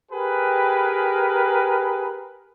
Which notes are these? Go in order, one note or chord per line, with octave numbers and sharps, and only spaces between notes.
G4 G#4 A#4 B4